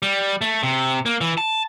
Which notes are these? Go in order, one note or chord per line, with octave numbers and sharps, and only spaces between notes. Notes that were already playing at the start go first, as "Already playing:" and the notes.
G3
A3
C3
A#3
E3
A5